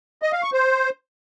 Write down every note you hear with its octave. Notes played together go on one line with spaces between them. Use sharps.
D#5
F5
C#6
C5